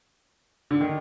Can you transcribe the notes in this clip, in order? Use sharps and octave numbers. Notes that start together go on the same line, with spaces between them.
D3
D#3